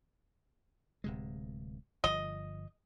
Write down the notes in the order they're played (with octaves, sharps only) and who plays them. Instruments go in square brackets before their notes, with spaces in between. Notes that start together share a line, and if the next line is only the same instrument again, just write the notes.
[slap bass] D1 C3 G#3
[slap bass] G1 F3 [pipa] D#5